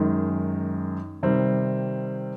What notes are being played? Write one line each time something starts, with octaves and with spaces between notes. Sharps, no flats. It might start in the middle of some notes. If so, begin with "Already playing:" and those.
Already playing: F#2 D#3 G#3
C3 D#3 G3 C4